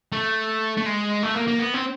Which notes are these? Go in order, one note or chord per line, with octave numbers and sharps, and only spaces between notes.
A3
A3
G#3
A3
A#3
A#3
B3
C4